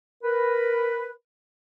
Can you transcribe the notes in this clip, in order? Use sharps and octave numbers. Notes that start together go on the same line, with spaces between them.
A#4 B4